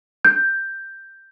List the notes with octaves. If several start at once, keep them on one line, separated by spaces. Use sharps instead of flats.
G6